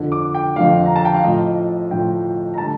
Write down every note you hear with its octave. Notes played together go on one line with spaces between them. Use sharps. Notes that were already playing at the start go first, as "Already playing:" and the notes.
Already playing: F2 D3 F3
D6
G5
F2 D3 F3 F5
A#5
A5
G5
F5
A2 F3 D#5
A2 F3 G5
A#5
D3 G3 A5